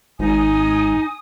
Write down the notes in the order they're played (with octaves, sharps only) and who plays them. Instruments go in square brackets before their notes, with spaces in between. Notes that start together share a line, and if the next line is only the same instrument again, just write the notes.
[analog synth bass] G#1 [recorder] D#4 [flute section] G#5 D#6